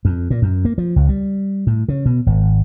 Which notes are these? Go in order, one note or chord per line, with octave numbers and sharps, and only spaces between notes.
F2
A#2
F#2
A#3
F3
C#2
G3
A2
C#3
B2
G#1